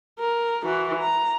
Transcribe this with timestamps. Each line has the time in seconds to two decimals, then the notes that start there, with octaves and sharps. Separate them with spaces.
0.19 A#4
0.64 E3 F#4
1.00 A#5